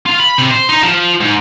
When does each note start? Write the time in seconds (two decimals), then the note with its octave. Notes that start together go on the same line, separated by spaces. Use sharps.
0.06 F4
0.20 B5
0.38 C3
0.51 C5
0.69 D#4
0.83 F3
1.21 G#2